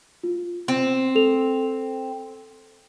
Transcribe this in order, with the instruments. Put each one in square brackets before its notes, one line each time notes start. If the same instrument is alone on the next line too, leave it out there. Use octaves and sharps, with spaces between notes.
[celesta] F4
[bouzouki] C4
[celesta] A4 F7